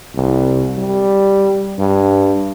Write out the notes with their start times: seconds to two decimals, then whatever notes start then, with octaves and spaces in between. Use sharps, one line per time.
0.16 C2
0.78 G3
1.79 G2